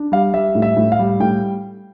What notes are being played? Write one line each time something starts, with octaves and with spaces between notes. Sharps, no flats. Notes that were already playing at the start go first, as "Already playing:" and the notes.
Already playing: D4
G3 F5
G3 E5
A2
E5
A2
F5
G3
A2 G5